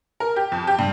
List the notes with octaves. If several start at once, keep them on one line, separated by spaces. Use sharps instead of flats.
A#4
G4
F2
G4
G2